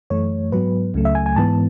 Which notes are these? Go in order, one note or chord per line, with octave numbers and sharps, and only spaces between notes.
F#2 E3 A3 C#5
G#2 F#3 B3 B4
C#2 C#3 F#3 A3
E5
G#5
G#5
G#2 E3 B3 A5